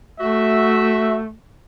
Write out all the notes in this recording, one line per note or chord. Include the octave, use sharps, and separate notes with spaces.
A3 F#4 E5